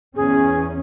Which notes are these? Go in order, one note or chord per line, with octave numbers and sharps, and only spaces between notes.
E2 C#4 G#4